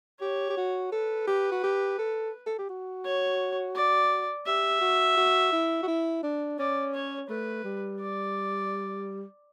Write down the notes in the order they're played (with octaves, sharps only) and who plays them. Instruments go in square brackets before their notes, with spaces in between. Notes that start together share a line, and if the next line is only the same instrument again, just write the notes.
[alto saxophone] G4 [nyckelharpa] C#5
[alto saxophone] G4
F#4
[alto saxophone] A4 [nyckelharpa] B4
[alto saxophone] G4
F#4
G4
A4
A4
G4
F#4
[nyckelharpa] C#5
D5
[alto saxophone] G4 [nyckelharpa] E5
[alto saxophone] F#4
F#4
E4
F#4
E4
D4
[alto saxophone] C#4 [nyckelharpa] D5
[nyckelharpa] C#5
[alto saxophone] A3 [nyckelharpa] B4
[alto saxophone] G3
[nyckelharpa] D5